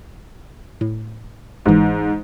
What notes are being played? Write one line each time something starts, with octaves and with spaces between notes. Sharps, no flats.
A2
G1 G#2 E3